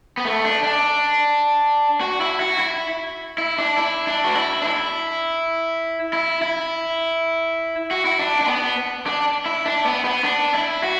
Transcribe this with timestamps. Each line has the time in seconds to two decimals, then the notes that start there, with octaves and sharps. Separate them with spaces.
0.17 B3
0.25 A3
0.44 D4
0.64 D4
2.01 F#4
2.21 E4
2.40 F#4
2.59 E4
3.38 E4
3.58 D4
3.77 E4
4.07 D4
4.25 F#4
4.36 E4
4.62 D4
4.65 E4
6.13 E4
6.42 E4
7.91 F#4
8.05 E4
8.19 D4
8.41 D4
8.48 B3
9.06 D4
9.46 E4
9.66 D4
9.86 B3
10.05 B3
10.24 D4
10.54 E4
10.83 F#4